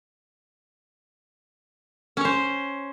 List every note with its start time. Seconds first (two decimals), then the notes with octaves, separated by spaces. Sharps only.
2.17 C#4
2.21 C#5
2.25 C5